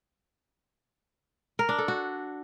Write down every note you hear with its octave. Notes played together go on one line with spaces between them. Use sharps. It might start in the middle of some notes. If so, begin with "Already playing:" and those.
A#4
D4
A4
F#4